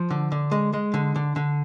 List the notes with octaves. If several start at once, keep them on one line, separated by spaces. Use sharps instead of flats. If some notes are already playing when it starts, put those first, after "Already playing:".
Already playing: F3
D3
D3
G#3
G#3
D3
D3
D3